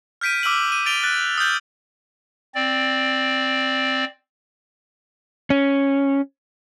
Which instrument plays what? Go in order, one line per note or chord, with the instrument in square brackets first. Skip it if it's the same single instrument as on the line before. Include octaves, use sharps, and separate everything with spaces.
[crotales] F6 G6 B6 D7 D#7
D6 E6 F6 D#7 F#7
D#7
A6 D7 F7 G7
F#6 A6
D#6 F6 G6 F#7
[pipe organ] C4 D5
[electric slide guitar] C#4